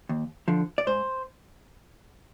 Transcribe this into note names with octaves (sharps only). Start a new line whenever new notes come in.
D#2
D3 F3
D5
G#2 C5